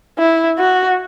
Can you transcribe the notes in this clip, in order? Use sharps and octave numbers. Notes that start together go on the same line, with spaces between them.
E4
F#4